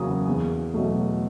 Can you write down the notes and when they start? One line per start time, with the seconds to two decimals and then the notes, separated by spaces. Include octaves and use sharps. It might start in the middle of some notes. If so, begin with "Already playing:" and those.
Already playing: E2 C#3 F#3 A#3 D#6
0.27 E2
0.74 B2 F#3 A3